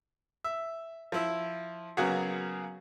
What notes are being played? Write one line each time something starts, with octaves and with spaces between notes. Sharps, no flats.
E5
F3 E4 E5
C#3 F#3 A#3 B3 F#4 G#4